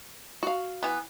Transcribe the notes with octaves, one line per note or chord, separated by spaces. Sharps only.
F#4 F5
E3 B3